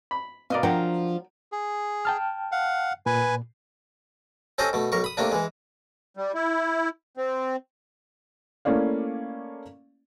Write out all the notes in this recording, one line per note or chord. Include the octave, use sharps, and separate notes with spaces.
B5
B2 A#4 D5 D#5 F5
F3 F#3 D4 A#4 F#5 G5
G#4
G5 A5 F6
F5 F#5
A#2 B4 G#5
C4 C#4 G4 A4 C5 D#5
B2 A3
B1 A#4 C#6
B5 D#6
C3 A3 A#3 D4
E3 G#3
G3
E4
C4
A3 A#3 C#4 E4 D5 F5